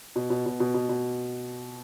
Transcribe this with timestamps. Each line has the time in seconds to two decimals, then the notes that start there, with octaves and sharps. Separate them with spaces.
0.16 B2
0.30 B2
0.46 B2
0.60 B2
0.74 B2
0.89 B2